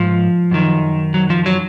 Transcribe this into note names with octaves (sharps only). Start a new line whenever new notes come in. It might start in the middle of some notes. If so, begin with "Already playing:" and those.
Already playing: G#2 F3
F#2 D#3
F#3
F3
F#3